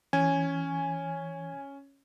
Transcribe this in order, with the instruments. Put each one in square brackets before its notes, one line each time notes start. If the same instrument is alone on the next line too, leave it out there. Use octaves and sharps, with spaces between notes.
[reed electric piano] E3 [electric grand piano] C#4 [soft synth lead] G#5